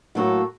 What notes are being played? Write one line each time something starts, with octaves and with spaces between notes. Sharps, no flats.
A2 F#3 A#3 F#4 A4